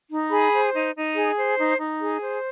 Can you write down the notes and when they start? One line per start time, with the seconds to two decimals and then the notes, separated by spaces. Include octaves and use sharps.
0.10 D#4
0.31 G#4 B5
0.52 C5
0.74 D#4
0.94 D#4
1.16 G#4
1.37 C5
1.58 D#4
1.78 D#4
2.01 G#4
2.22 C5